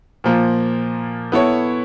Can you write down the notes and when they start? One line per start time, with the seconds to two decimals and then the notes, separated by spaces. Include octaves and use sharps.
0.24 A#2 F3 A#3
1.32 B3 E4 A4 C#5